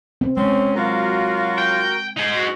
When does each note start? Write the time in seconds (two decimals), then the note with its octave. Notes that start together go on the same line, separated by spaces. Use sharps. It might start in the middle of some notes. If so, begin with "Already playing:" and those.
0.21 C4
0.37 G#3 C4 C#4
0.75 F#3 F4 F#4 A#4 F5
1.58 G5
2.17 D#4 G#4
2.35 F#4